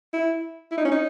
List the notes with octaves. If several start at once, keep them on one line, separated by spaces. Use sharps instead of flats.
E4
E4
D#4
C#4
D#4